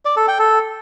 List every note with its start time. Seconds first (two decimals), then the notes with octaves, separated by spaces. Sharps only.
0.05 D5
0.17 A4
0.28 G5
0.39 A4